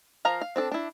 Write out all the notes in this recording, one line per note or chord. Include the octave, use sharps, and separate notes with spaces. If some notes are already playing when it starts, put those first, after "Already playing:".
F3 A#4 F5 A#5
F5
C4 D4 A4
D4 E4